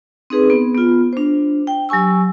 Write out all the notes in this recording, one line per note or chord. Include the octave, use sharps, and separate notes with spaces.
C4 D#4 G#4 B4
B3
B3 F4
D4 C5
G5
F#3 G4 G#5 C#6 E6